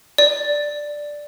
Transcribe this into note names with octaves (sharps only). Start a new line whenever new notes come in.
D5